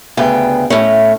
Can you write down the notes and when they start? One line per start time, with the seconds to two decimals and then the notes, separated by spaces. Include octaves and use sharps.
0.17 D2 C#3 B3 G5
0.70 A2 C#4